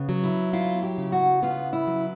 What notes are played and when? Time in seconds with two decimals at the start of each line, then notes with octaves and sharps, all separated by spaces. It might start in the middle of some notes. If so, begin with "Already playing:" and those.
Already playing: C#3 B3
0.09 F#3
0.23 E4
0.53 E4 F4
0.83 G4
0.98 C#3
1.12 F#4
1.43 B3 F4
1.73 E4
1.87 F#3